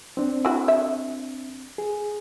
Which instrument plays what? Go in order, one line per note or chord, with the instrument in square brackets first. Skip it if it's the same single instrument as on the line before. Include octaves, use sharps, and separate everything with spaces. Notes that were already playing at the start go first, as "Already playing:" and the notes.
[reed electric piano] C4 D4
[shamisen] E4 F#4
E5
[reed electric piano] G#4